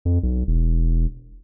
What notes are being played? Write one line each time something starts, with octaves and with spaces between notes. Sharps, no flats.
F2
B1
E1